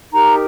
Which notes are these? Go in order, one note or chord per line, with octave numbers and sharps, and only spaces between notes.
D#4 G4 A#4 A#5